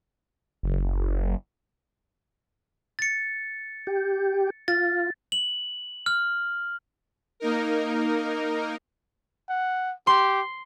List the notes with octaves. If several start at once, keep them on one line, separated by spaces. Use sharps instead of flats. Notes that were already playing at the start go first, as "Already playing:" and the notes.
F#1
A6 C#7
G4
F4 A6
F#7
F6
A#3 D#4 A#4
F#5
G4 C6